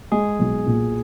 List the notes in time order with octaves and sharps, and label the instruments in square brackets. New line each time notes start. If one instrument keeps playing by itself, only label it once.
[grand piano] G#3 [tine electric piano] G#4
[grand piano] B1
A#2